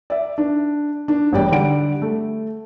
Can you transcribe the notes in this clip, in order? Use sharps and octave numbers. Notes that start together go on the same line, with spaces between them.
D5 E5
D4
D4
E1 A1 E2 G3 D5 G5
D3 G3 D5 F#5 D7
A3